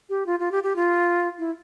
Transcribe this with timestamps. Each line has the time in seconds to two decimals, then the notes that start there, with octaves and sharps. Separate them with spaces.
0.09 G4
0.26 F4
0.40 F4
0.52 G4
0.63 G4
0.76 F4
1.39 E4